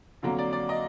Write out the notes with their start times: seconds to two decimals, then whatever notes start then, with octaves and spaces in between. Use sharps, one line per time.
0.22 F2 D3 F#3 A#3
0.39 D5
0.53 D5
0.69 D#5